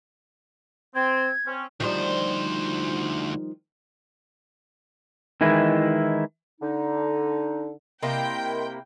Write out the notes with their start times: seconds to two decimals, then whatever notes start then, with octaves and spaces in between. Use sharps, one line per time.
0.95 C4 G#6
1.47 C4 C#4
1.80 D2 D#3 F3 G3 C5
5.41 D#3 E3 G#3 E4
6.61 D3 D#4
8.03 C3 A#3 E4 A#4 D#5 G5 C6